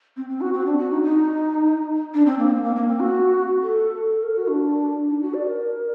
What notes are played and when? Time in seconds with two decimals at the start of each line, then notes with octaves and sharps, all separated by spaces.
0.17 C4
0.29 C4
0.41 F#4
0.54 C4
0.66 D4
0.79 F#4
0.91 D#4
1.03 D#4
2.14 D4
2.26 C4
2.39 A#3
2.51 C4
2.63 A#3
2.76 A#3
2.88 C4
3.00 F#4
3.62 A4
4.11 A4
4.23 A#4
4.36 F#4
4.48 D4
5.09 D#4
5.22 F#4
5.34 D5
5.47 A#4